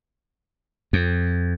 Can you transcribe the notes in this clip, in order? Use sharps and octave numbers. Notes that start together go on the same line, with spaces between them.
F2